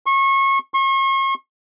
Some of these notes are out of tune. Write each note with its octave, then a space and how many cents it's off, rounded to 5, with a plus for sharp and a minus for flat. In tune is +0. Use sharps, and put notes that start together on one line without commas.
C#6 -30
C#6 -40